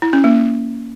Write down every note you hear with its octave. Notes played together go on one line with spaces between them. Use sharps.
E4
C#4
A#3